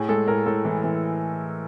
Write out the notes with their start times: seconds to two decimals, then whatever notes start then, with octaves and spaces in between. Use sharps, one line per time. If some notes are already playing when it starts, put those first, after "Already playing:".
Already playing: A2 G#4
0.09 G#3 A4
0.27 A2 A#4
0.46 A2 A4
0.65 E3
0.84 E3